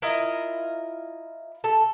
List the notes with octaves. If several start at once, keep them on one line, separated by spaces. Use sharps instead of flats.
E4 F4 A#4 D#5
A4